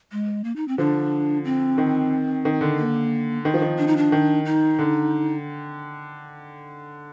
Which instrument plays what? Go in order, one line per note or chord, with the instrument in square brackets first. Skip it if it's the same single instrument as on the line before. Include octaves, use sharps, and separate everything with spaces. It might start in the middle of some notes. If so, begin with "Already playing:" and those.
[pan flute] G#3
A#3
D#4
C4
[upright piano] D3 F3 [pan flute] D4
[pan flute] C4
[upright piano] D#3
D#3
D3
[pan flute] A#3
[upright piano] D#3
F3
D#3
[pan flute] D4
D#4
D4
[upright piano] D#3
[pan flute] D#4
[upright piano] D3